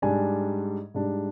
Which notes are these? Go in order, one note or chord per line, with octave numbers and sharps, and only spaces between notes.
G#2 G3 D4 G#5
G#2 G3 D4